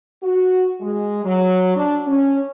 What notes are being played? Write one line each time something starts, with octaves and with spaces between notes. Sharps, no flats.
F#4
G#3
F#3
D4
C#4